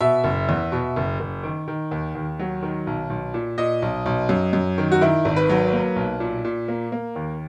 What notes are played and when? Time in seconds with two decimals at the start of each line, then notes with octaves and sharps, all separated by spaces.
0.01 B2 E5
0.24 F#1
0.49 E2
0.72 B2
0.96 F#1
1.20 F#1
1.43 D#3
1.68 D#3
1.91 D#2
2.15 D#2
2.39 F#3
2.63 D#3
2.87 B1
3.10 B1
3.34 A#2
3.58 A#2 D#5
3.82 B1
4.06 B1
4.29 F#2
4.53 F#2
4.78 D#3
4.92 F#4
5.01 D#3 E4
5.25 G#1
5.36 B4
5.49 F#3
5.72 A#3
5.96 B1
6.20 A#2
6.44 A#2
6.68 A#3
6.92 A#3
7.16 D#2